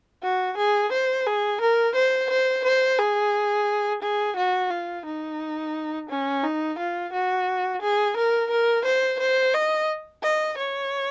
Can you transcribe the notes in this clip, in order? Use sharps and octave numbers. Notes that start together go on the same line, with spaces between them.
F#4
G#4
C5
G#4
A#4
C5
C5
C5
G#4
G#4
F#4
F4
D#4
C#4
D#4
F4
F#4
G#4
A#4
A#4
C5
C5
D#5
D#5
C#5